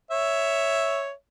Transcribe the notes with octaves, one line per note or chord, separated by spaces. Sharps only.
C#5 E5